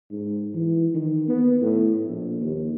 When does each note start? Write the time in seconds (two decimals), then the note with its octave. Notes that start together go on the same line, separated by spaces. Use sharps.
0.11 G#2
0.54 E3
0.94 D#3
1.28 B3
1.62 A2
2.06 A#1
2.41 D#2